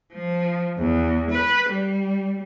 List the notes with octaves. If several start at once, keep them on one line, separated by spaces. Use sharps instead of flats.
F3
E2
B4
G3